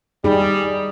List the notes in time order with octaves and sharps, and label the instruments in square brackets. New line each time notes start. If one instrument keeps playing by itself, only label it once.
[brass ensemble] G3 [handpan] D#4 G#4